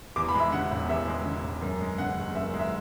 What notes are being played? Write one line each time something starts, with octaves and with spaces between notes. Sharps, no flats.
E2 D6
B5
G#3 E5
C#3 F#5
E1
E2 E5
G#3
C#3
E1
F#2
G#3
C#3 F#5
F#1
F#2 E5
G#3
E5